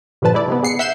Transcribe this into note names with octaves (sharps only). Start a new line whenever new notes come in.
G2 A#2 D3 F3 B4 A5
G#3 E4 D5
C3 D#3 B3
G#3 B3 C7 C#7
E5 F#5 G6 C7 E7